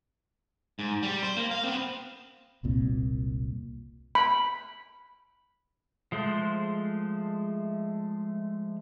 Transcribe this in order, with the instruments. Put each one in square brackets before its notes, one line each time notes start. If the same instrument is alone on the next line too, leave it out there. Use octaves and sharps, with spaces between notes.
[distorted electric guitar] G#2
G3
C5
A#3
F5
B3 C4
[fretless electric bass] E1 C2 A#2 C4
[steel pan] B5
[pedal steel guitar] F3 G#3 A3 C5